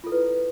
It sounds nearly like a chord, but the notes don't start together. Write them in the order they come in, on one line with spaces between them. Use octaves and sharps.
F4 A4 E4 B4